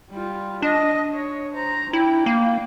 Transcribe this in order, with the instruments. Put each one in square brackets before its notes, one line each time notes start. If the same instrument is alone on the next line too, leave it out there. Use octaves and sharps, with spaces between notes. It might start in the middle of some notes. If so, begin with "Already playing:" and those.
[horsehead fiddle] G3 F4
[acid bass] D4 [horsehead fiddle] D#5
[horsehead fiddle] C#5
C5 A#5
[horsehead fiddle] D4 G5 [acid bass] E4
[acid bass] A#3